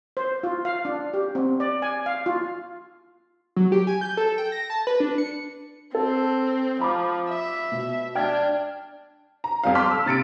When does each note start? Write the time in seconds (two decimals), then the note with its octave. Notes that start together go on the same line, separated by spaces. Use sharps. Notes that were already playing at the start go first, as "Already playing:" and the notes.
0.17 C5
0.43 F4
0.65 F5
0.85 D4
1.14 G4
1.35 C4
1.60 D5
1.82 G#5
2.06 F5
2.26 F4
3.56 F#3
3.72 G4
3.87 G#5
4.01 G6
4.17 A4
4.38 G5
4.52 A#6
4.70 A5
4.87 B4
5.00 D4
5.18 C#7
5.95 C4 A4
6.81 F3 B5 D6
7.30 E5
7.72 B2
8.15 D4 G5 F6 G#6
9.44 A#5
9.64 F2 G3 F5
9.75 A5 C6 D6 F6 B6
9.91 E6
10.06 C3 A6 C#7 D7